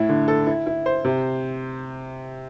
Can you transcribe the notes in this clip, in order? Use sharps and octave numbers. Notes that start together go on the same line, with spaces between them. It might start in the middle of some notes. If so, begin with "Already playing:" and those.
Already playing: A2 E4
D3
A4
E4
E4
C5
C3